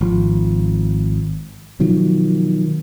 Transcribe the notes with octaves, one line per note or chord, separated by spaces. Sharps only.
G#1 F3
B2 D#3 F3 F#3